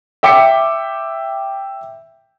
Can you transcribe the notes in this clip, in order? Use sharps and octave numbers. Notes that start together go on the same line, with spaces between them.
E5 G5 D6 B6 C#7